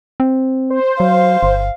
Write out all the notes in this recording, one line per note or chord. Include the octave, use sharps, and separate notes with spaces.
C4
C5
F#3 F5
G1